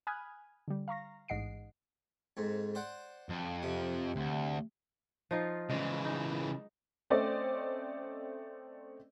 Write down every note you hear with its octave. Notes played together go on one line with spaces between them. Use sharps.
G#5 B5 D#6 F6 F#6 G#6
D3 G3
F5 A#5 C#6 A#6
A1 G#2 D#5 F#5 C7 D7
F2 G#2
C5 D5 F#5
F2
C3
D2
F3 D#4 F4
C#3 E3 G#3 D5
D#4
A3 C4 C#4 C5 D5 D#5